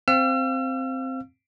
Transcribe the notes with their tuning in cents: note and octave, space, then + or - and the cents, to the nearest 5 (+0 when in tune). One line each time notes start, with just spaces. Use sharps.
C4 +0 F5 +0 E6 +45